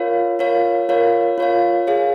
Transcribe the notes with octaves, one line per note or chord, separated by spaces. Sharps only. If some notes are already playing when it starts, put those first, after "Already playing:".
Already playing: F4 A#4 C#5 F5
F4 A#4 C#5 F5
F4 A#4 C#5 F5
F4 A#4 C#5 F5
G#4 C#5 F5